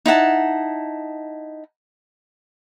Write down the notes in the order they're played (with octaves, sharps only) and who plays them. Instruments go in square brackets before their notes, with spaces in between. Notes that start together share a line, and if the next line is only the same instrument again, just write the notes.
[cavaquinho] D#4 E4 F#5 A5